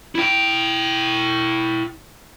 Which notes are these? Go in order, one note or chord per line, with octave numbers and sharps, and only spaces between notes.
E4 G5